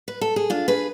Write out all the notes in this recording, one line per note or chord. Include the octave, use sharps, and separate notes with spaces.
B4
A4
G#4
D4 F4
G#4 B4